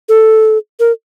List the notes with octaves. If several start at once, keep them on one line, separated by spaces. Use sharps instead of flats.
A4
A#4